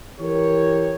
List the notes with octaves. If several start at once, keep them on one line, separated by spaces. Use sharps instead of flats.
E3 G4 A#4 C#5